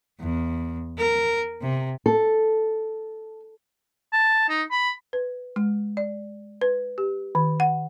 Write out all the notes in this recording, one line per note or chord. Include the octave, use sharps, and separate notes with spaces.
E2
A#4
C3
A4
A5
D#4
B5
B4
G#3
D5
B4
G4
D#3
F#5